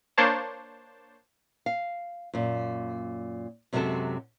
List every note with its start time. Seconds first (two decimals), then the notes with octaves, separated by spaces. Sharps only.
0.18 A#3 D4 C5 C#5 A5
1.66 F5
2.33 F#2 A#2
3.73 F#2 C3 F#3 G#3 F#4 A4